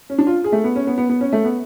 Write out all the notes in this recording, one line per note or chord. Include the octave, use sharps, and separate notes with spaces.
C#4
D4
F4
G#4
A3
B3
C#4
B3
B3
B3
C#4
A3
B3